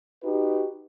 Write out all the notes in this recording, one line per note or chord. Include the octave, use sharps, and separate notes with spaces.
D#4 F#4 G4 B4